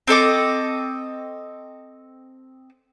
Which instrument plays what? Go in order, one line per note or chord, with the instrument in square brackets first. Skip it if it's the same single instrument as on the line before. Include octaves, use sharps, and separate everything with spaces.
[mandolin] C4 A4 D#5 D6